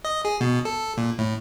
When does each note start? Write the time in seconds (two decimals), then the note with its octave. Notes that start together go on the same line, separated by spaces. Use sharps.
0.05 D#5
0.25 G#4
0.41 B2
0.65 A4
0.98 A#2
1.19 A2